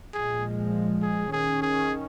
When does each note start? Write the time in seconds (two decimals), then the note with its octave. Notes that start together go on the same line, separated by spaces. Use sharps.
0.14 A#2 F3 G#3 G#4
1.02 G#4
1.33 D#3 C#4 G#4
1.62 G#4